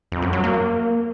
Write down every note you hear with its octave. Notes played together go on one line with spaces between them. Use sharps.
F2
F#2
F#3
A#3